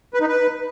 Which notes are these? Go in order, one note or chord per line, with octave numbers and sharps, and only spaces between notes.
B4
D#4
B4